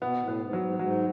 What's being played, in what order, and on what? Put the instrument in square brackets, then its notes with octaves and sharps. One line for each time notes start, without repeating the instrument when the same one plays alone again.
[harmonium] B2 [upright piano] B3
[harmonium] A2
[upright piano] B3
[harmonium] G#2
[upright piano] F#3
[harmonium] G#2
[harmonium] G#2 [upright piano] F#3